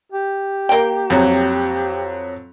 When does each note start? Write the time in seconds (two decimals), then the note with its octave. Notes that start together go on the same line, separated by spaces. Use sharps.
0.12 G4
0.69 A#3 G5
1.10 F2 F#3